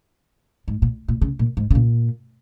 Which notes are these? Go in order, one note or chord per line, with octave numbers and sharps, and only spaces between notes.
G#2
A#2
A#2
C#3
A#2
G#2
C#3
A#2